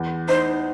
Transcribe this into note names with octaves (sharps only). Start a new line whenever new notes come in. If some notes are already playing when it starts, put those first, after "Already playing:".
Already playing: E2
D#4 C5